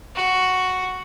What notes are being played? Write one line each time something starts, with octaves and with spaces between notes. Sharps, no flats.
F#4